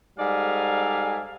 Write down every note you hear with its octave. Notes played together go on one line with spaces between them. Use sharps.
G#2 G3 A4 D5 F5 G#5